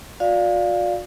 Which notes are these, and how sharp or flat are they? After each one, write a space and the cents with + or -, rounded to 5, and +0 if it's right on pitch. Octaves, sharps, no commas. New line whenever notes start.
F#4 -45 D5 +0 F5 +0